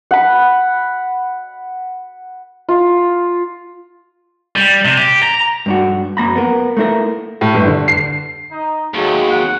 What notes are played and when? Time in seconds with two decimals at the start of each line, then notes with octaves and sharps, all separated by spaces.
0.11 F#5 B5
2.68 F4
4.56 G3
4.85 C3
4.97 G4
5.23 A#5
5.66 G2 D4 F#4
6.17 F#2 A#3 A#5 B5
6.36 B3 A#4
6.77 A3 A#3 E4 G#4 A#4
7.41 A2
7.55 G1
7.67 D3
7.88 C7
8.51 D#4
8.94 D#2 F#3 G#3 A3
9.28 F#5